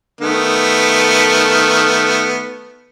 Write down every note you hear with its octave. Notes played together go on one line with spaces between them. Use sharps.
D#3 A3 B3